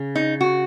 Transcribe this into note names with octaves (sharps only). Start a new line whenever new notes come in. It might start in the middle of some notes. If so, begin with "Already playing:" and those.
Already playing: C#3
D#4
F#4